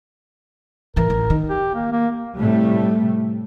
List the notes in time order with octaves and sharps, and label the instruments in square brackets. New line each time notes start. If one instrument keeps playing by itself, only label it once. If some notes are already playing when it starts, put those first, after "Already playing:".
[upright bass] A1 E3 [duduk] A#4
[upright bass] A1
D#3
[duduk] G4
A#3
A#3
[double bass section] A2 C3 G3 A3